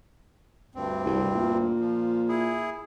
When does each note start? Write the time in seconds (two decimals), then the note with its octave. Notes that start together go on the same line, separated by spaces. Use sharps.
0.75 D2 G2 C4
1.05 C2
1.35 A#2
1.80 F3
2.28 E4 G#4